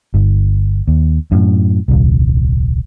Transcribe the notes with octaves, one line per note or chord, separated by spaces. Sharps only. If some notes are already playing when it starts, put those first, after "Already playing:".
G1
D#2
F#2 A2
D#1 C2